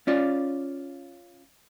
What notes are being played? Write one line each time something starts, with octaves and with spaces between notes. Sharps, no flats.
C#4 F4 D5